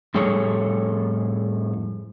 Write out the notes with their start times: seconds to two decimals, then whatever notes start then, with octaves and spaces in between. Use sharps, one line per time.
0.14 F2 A2 G3 G#4 A4 C#5